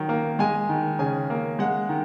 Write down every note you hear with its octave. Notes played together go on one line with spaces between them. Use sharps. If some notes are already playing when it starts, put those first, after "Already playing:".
Already playing: D#3 F#3
A#3
G#3 G#5
D#3
C#3 G#5
A#3
G#3 F#5
D#3